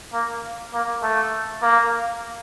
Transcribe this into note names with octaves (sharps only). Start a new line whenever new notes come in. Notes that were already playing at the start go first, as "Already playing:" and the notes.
A#3
A#3
A3
A#3